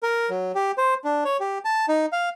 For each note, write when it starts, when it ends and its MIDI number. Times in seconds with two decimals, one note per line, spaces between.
0.03 0.30 70
0.30 0.52 54
0.55 0.72 67
0.78 0.94 72
1.04 1.24 62
1.25 1.37 73
1.40 1.58 67
1.65 1.86 81
1.88 2.06 63
2.12 2.29 77